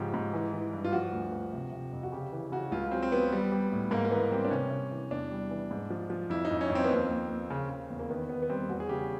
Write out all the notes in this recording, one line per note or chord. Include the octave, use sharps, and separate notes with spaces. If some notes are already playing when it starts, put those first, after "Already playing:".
Already playing: G#2 C#3 F3 G4
G#2
E3
E3
G2
F4
F3 F#4
D2
F3
C3
C3
F2
F#4
C#3 G4
E3
C#3 F#4
C#2 F4
F#3 C4
C4
F#3 B3
G3
G3
A2
G#2 A#3
A#3
E3 B3
G3 C4
D4
C3 C#4
C3
E3
E2 D4
G3
E3
G#2
F3
F3
F2 E4
D#4
F2
C#4
F2
C4
B3
D#2 C4
D#2
D#2
C#3
C#3
E2
A#3
D#3 B3
D#3 B3
B3
G3 C4
E2 F#4
G#4
C#3 G4